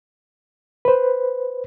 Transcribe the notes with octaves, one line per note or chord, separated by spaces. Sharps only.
B4 C5